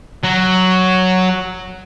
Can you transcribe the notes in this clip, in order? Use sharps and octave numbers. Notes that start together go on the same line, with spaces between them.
F#3